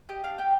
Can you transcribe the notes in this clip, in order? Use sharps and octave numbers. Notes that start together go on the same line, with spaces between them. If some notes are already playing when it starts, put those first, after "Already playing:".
G4 D#5
D4 F5
G4 G5